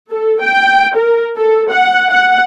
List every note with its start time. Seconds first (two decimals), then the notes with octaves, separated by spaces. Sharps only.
0.10 A4
0.41 G5
0.95 A#4
1.37 A4
1.70 F#5
2.11 F#5